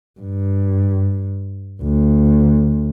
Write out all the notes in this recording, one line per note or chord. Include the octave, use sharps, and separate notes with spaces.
G2
D2